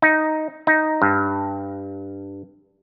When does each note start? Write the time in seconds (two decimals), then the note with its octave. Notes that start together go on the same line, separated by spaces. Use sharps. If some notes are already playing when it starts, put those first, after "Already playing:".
0.02 D#4
0.67 D#4
1.02 G2